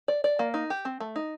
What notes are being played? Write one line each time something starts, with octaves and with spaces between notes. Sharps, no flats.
D5
D5
A#3
D#4
G4
C4
A3
D#4